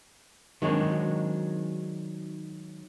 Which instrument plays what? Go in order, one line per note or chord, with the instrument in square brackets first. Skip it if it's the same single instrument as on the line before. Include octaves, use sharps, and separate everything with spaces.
[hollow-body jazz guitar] D#3 F#3 G#3 C4 D4